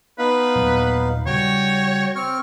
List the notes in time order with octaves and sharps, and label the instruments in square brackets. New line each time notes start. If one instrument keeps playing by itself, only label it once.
[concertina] B3 D#4 F5 [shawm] B4
[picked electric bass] D#2 A#2 F#3
[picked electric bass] C#3 G3 [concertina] F#4 G5 [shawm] C#5
[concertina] C4 C#6 F6